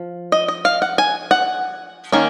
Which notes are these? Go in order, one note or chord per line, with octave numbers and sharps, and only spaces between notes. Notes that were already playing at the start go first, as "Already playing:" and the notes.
Already playing: F3
D#5
D#5
F5
F#5
G#5
F#5
D#3 A#3 C#4